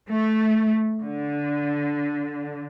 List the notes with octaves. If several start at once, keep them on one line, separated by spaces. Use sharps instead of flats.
A3
D3